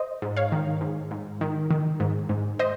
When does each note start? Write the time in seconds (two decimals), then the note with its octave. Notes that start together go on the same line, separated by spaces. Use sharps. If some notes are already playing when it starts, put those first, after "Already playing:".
Already playing: C5 D#5
0.22 G#2
0.37 C#5 F5
0.52 D#3
0.81 G#2
1.11 G#2
1.41 D#3
1.71 D#3
2.00 G#2
2.29 G#2
2.59 C5 D#5